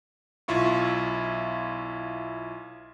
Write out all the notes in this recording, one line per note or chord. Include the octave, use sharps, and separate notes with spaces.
B1 E4 F4 C#6